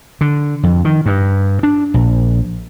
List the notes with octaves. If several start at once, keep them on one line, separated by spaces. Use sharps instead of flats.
D3
F2
D#3
G2
D4
A#1